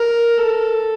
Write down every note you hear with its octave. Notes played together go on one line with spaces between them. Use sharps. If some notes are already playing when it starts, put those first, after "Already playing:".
Already playing: A#4
A4